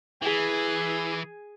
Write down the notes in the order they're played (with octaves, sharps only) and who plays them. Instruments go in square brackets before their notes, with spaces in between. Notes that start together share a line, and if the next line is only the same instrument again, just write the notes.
[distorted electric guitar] E3 [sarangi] G#4